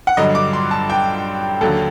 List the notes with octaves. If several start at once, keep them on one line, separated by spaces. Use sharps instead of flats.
F#5
G2 D3 F#3 D#5
D6
C6
A5
G5
D#2 D3 F#3 A4